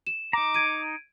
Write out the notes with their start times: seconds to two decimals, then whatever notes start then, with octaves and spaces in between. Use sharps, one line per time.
0.07 E7
0.33 D#4 A#5 D6
0.54 G#6 D7 D#7